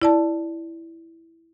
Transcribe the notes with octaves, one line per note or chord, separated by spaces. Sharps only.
E4 D5 A5